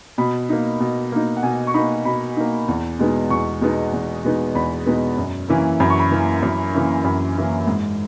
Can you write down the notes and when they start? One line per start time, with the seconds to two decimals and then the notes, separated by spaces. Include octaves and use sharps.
0.18 B2 B5
0.49 A#3 D#4
0.80 B2
1.12 A#3 D#4
1.37 F#5
1.43 B2 G#5
1.67 C#6
1.74 A#3 D#4 B5
2.05 B2 B5
2.37 A#3 D#4
2.68 E2
2.99 B2 G#3 B3 D#4
3.30 E2 C#6
3.61 B2 G#3 B3 D#4
3.93 E2
4.24 B2 G#3 B3 D#4
4.55 E2 B5
4.86 B2 G#3 B3 D#4
5.17 F#2
5.49 E3 A#3 C#4 E4
5.80 F#2 B5
5.90 C#6
5.99 B5
6.11 E3 A#3 C#4 E4
6.43 F#2
6.73 E3 A#3 C#4 E4
7.04 F#2 B5
7.36 E3 A#3 C#4 E4
7.67 G#2